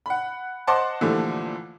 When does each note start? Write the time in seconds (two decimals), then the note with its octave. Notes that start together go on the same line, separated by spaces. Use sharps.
0.06 F#5 B5
0.67 C5 D#5 F#5 A5 C6 D6
1.01 A#2 D3 E3 F3 G3 A3